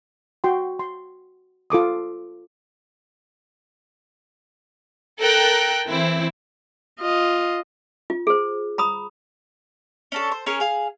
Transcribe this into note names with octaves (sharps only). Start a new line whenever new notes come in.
F#4 G5 C6
C6
F4 A4 D6 D#6
A4 A#4 G5 F#6
E3 C4 E4
F4 D#5
F4
G#4 C5
A#5 B5 D#6
C#4 D4 A4
C5
C#4 G#4 A#4 C#5
G#4 F5